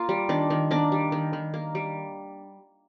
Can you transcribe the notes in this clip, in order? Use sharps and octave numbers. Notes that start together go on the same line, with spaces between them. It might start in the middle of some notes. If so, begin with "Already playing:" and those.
Already playing: A#3 F4
G3
D#3 D4
D#3
A#3 D4
G3
D#3
D#3
A#3
G3